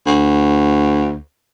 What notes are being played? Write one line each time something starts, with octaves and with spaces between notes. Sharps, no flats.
D2